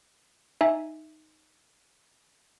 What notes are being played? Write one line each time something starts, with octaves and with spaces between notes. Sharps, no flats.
D#4 E5 G#5